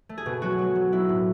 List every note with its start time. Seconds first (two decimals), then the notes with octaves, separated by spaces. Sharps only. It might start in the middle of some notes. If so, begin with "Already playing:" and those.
0.09 A3
0.18 G#4
0.26 B2
0.42 F#3 F#4
0.59 F#3
0.75 F#3
0.92 B3 E4
1.09 A2